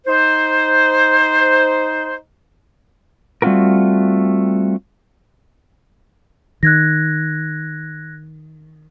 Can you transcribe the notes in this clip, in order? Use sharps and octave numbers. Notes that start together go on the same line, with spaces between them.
D#4 C5
G3 A3 C4 F4 F#4 A#4
D#3 F#6 G#6 A#6